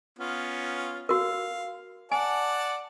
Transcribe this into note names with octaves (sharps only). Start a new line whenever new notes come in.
B3 C#4 F4
F#4 A#4 F5
D5 F#5 G#5 A5